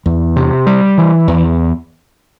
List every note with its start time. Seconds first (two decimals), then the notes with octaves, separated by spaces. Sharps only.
0.06 E2
0.36 C3
0.67 G3
0.98 E3
1.28 E2